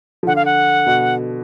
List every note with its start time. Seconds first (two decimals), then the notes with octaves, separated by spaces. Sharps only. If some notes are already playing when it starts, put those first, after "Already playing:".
0.23 F3
0.27 D3 F#5
0.36 F5
0.45 F#5
0.86 B2